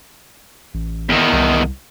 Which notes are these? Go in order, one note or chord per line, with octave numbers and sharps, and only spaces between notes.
A1
E2 D#3
C2